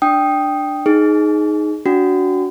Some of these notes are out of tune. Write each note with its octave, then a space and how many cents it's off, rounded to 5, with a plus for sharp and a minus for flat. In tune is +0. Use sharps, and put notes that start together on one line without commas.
D4 +10 G5 +0 D#6 +0
D#4 +0 G#4 +15
D4 -30 F#4 +0